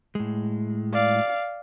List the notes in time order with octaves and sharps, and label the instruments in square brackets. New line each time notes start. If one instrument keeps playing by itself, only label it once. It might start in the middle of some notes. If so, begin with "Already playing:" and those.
[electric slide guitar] A2 G#3
[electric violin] D5 F5